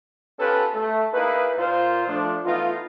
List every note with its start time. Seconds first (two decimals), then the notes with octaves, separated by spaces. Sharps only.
0.39 B3 C#4 F4 G4 A4 B4
0.74 A3
1.13 A#3 D#4 E4 G#4 B4
1.58 A#2 F4 C5
2.08 F3 A3 D4
2.45 E3 A3 B3 D#4 F4